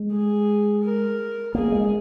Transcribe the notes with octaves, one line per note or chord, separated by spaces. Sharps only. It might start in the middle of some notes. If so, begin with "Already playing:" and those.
Already playing: G#3
G#4
A#4
A#3 G#4
G#3